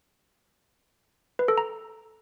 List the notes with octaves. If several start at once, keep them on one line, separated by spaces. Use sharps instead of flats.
B4
A4
A#5